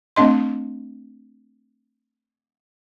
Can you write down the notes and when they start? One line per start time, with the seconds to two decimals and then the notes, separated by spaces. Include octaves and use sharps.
0.16 A3 C4 D4 D#5 C6